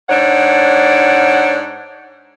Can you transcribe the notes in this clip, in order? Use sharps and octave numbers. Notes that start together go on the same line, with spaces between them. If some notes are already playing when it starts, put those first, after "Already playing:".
G#2 D4 C#5 F#5